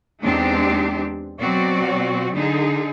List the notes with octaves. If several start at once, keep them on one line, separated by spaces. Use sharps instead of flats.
E2 G#3 C4 D4 D#4 G4
B2 F#3 C4 F#4 D5
D3 D#4 G#4